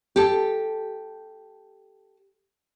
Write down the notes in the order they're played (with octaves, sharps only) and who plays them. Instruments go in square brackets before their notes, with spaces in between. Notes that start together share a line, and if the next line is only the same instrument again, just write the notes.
[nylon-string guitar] G4 A4